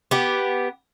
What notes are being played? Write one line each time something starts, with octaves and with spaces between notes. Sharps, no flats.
B3 G4